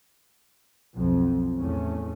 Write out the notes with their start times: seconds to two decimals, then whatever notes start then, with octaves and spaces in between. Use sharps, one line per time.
0.94 B1 F2
1.57 E2 A2 A3 C#4